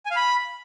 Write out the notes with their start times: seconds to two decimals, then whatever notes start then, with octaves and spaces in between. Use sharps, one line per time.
0.06 G#5
0.11 F5
0.16 B5